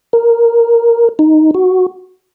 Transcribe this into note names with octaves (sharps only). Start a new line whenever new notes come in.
A#4
D#4
F#4